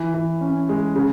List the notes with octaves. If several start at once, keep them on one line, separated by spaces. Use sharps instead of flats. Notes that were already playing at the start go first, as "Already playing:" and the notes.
Already playing: E3
E3
C#4
G#3
C#3